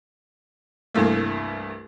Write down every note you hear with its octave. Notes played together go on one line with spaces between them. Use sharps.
C2 G2 E3 A3 A#3